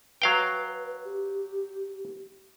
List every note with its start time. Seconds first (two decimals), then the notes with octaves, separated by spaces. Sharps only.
0.22 F#3 B4 F5 G5
1.04 G4